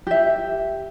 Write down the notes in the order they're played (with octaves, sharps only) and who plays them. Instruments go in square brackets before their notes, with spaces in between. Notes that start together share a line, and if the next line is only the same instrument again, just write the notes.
[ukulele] G4 E5